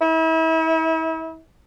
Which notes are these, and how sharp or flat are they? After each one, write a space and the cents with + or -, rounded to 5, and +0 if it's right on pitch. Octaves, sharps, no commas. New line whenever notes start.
E4 -35